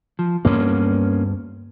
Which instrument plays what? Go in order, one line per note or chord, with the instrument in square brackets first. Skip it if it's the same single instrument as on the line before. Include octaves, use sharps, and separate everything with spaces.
[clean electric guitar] F3
[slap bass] D2 G2 B3 [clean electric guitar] A#3 C#4